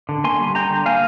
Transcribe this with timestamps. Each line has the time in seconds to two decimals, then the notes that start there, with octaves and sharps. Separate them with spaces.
0.09 D3
0.24 A#3 G#5 C6
0.40 G3
0.55 D3 G5 A#5
0.70 D3
0.86 A#3 F5 G#5